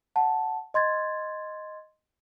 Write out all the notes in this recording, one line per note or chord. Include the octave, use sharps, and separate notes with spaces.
F#5 A5
D#5 C6 G#6 A6